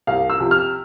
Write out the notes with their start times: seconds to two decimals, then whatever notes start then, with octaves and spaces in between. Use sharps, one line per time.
0.07 C2 F5
0.30 E6
0.40 C3 F3
0.51 F6